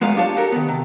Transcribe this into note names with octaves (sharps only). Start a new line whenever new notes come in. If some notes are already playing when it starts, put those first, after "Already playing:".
F#3 G#3 A3 B3 C#5 F5
D4 F4 G4 C#5 A5
F#4 G4 A4 A#4
D#3 B3
C3